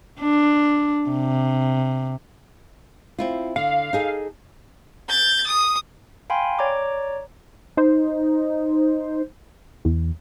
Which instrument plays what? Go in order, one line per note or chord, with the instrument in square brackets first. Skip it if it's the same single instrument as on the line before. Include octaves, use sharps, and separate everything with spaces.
[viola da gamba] D4
C3
[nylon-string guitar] C4 E4 F4
[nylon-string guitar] D3 [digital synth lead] F5
[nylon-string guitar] D#4 G#4 A4
[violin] G6 A6
D#6
[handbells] F5 G5 G#5 B5 C6
C#5 D5 A#5 D6
[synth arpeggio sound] D#4 C5
E2